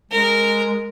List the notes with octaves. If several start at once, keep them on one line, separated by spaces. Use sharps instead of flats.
G#3 A#4